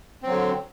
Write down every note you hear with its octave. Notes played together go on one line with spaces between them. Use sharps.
D3 F#3 C4